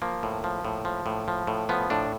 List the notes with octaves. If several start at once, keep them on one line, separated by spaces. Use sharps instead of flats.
F3 A#3
A2
F3
A2
F3
A2
F3
A2
F3 B3
A2 D4